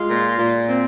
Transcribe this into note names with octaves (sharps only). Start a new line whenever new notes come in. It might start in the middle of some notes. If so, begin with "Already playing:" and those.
Already playing: G#3 F4
A#2
A#2
C4